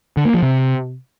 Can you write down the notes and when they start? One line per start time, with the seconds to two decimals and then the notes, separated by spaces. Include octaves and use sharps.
0.17 D3
0.25 A#3
0.34 F3
0.43 C3